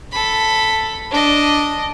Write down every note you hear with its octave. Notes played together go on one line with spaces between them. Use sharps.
A4 B5
D4 D#5